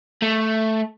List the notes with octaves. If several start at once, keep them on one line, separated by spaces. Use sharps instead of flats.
A3